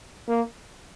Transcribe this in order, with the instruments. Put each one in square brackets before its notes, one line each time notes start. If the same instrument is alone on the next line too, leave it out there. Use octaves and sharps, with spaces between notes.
[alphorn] A#3